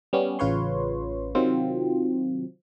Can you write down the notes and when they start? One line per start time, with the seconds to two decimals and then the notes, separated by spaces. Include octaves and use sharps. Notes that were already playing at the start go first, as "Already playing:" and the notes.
0.13 G3 B3 C#4
0.39 A1 C#3 F4 B4 C#5 C6
1.35 C3 D#3 F#3 C4 F4